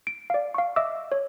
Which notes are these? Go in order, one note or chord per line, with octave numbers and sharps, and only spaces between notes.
D7
D5 F5
F5 C#6
D#5 E5 D6 E6
C#5